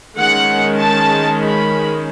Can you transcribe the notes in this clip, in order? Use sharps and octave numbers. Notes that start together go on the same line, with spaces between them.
D#3 G#3 C#4 F#5
A5
B5